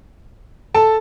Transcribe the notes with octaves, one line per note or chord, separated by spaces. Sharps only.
A4 A5